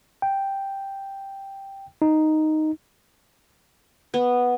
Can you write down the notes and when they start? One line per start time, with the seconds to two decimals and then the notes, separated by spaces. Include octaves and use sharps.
0.22 G5
2.02 D#4
4.14 B3